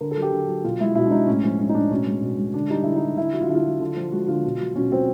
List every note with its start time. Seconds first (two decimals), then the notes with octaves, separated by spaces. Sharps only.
0.01 D3 A#4
0.11 A4
0.17 F#3
0.22 G4
0.33 D3
0.48 F#3
0.64 B2 F4
0.80 G#3 E4
0.95 B2 E4
1.06 D4
1.11 G#3 D#4
1.27 A2 C#4
1.43 F3 C#4
1.59 G#3 C#4
1.69 D#4
1.74 A2 D4
1.91 B2 C#4
2.07 G#3
2.22 B2
2.39 G#3
2.54 D3 D4
2.70 G3 D#4
2.83 D3 E4
2.96 D#4
3.02 G3
3.17 D3 E4
3.33 F#3 F#4
3.41 F4
3.49 D3 E4
3.55 F4
3.64 F#3
3.80 D3
3.97 F3
4.12 G#3 F#4
4.28 D3 F4
4.45 B2
4.60 F#3
4.76 B2 C#4
4.91 F#3 C4